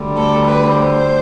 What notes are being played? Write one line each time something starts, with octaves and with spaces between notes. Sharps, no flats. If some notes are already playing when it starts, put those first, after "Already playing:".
Already playing: D2 D3 G3
A4
B4
C5